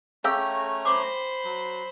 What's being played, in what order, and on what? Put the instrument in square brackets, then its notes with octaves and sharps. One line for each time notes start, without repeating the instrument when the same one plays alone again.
[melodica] A3 C#4 A#5 [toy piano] G#4 F5 E6 [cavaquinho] G5
[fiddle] C5 B5 [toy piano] D6
[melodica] F#3